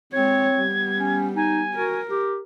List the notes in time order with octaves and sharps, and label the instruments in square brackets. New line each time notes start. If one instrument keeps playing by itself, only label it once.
[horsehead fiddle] G#3 C#5 [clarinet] C4 [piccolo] G#6
[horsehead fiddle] G3 B3
[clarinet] C#4
[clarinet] D#4 [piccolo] G#5
[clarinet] F#4 [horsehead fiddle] A#4
[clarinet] G4